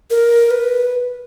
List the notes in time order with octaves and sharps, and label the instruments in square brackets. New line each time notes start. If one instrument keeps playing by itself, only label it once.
[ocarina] A#4
B4